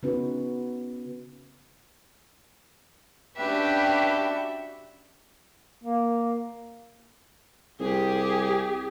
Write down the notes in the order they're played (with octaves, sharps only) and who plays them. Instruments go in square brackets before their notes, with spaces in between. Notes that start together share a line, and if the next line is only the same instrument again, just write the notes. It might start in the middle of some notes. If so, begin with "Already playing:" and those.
[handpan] C#3 B3 C#4 D#4 F#4 B4
[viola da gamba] C#4 D4 F#4 [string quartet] G4 G5 [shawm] B4 [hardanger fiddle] E5 B5
[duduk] A#3
[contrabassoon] C2 [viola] G4 G#4